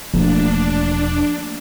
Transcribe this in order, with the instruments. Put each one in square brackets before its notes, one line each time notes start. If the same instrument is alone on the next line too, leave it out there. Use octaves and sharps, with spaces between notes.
[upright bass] E1 [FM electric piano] F3 A3 A#3 [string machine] D4